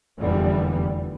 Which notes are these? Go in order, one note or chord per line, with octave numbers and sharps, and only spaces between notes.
F1 E2 A#2 D3 E3 G3